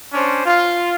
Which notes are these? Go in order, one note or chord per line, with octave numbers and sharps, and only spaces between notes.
C#4 D4 C5
F4